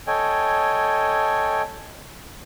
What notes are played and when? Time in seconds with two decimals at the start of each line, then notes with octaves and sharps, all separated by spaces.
0.07 A4 C#5 D#5 G5 G#5